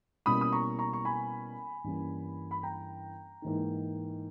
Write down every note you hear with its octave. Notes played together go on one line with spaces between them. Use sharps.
B2 G3 A#3 C#4 E4 B5 D#6
D#6
A#5 C#6
A#5 C#6
C#6
G#5 B5
G2 E3 G3 A#3 C#4
B5
G5 A#5
G#2 E3 A#3 D#4